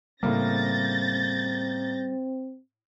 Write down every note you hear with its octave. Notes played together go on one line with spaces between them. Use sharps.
A2 C#3 G3 A#3 C4 G6 A6 A#6